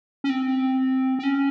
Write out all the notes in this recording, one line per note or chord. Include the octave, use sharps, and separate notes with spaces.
C#4
C4
C4
C#4